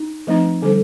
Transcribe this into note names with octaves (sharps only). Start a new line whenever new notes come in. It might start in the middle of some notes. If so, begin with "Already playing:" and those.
Already playing: D#4
F3 A3 C4 D#4
D3 G3 D4 A4 C5